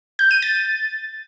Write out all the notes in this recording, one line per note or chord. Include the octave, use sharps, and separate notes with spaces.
G6
D#7
A6